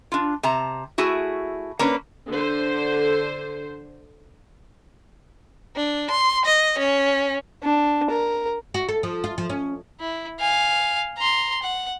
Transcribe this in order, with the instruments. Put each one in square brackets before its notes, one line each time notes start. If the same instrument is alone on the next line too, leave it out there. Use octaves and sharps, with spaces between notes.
[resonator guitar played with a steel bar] D4 F4
C3 A5 A#5
A3 E4 F#4 G#4
A#3 C#4 D4 B4
[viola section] D3 C5
[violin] D4
C6
D#5
C#4
[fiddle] D4
A#4
[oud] F#4
A4
F3
F4
F3
C#4
[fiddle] E4
F5 G#5
A#5 C6
F#5